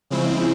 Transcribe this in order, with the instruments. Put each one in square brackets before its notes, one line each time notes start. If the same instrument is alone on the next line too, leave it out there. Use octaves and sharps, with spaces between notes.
[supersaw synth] C#3 F3 G#3 C4 E4